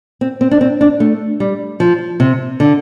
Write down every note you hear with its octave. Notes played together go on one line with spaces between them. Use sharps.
C4
C4
D4
C4
D4
A3
G3
F3
C3
D3